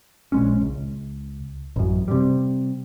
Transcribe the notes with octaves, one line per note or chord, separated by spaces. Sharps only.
A#1 G#3 C#4
C#2
A1 F#2
C3 G3